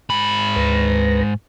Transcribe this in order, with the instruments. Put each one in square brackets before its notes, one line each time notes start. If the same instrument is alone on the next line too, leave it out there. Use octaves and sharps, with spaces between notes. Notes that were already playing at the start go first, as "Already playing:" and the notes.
[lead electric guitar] G#2 B5 [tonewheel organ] G#5
[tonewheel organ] D2 B4 A#6